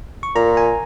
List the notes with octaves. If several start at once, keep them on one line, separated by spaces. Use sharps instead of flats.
C#6
A#2 A#5
G#5